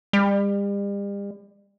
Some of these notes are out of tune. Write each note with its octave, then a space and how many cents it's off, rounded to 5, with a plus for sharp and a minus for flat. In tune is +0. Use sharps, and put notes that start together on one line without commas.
G3 +40